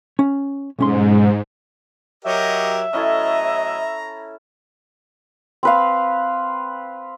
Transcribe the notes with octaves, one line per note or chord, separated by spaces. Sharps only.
C#4
B1 G#2 C#4 C6
F#3 G4 A#4 D#5 E5
A2 F#3 C#4 E4 A4 D#5 A#5
C4 B4 F5